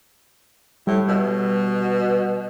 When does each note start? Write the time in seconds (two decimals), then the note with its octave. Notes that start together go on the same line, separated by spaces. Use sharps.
0.87 A2 G3
1.08 B2